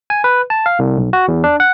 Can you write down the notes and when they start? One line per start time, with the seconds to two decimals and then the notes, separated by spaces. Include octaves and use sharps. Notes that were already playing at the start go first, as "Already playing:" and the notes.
0.10 G#5
0.24 B4
0.50 A5
0.66 F5
0.79 C2
0.97 B1
1.13 F#4
1.28 E2
1.44 D4
1.60 F#5